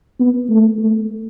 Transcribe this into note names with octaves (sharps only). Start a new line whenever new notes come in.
B3
A3
A3